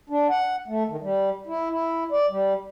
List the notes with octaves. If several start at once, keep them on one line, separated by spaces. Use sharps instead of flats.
D4
F#5
A3
D#3
G3
E4
E4
D5
G3